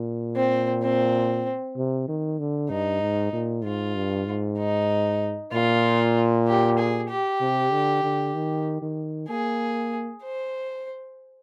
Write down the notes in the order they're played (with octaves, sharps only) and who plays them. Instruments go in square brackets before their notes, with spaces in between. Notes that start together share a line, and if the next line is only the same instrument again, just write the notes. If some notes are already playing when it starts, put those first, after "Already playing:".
Already playing: [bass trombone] A#2
[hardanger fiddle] C4
C4
[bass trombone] C3
D#3
D3
[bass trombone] G2 [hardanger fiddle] D#4
[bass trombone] G#2
A#2
[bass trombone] G#2 [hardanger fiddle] F4
[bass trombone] G2
G#2
[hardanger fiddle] D#4
[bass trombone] A#2 [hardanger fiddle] F4
[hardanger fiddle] G4
G#4
G4
[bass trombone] C3
D3
D3
D#3
D#3
[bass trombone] A#3 [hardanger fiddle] G#4
[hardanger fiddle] C5